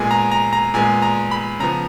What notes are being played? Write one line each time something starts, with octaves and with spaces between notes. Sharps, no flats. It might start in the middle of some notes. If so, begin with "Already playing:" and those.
Already playing: A#2 G#3 B3 G#5
A#5
A#5
A#5
A#2 G#3 B3 G#5
A#5
B5
C#3 F3 B3 A#5